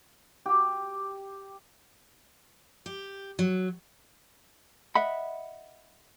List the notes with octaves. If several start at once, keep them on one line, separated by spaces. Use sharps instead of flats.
G4
G4
F#3
D#5 E5 F#5 B5